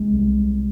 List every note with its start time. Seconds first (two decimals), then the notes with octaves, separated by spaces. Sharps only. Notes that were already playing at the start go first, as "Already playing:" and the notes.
Already playing: C2 G#3
0.14 C2
0.38 C2